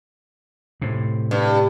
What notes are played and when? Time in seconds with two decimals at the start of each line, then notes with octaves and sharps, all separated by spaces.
0.82 A2 C3
1.31 G2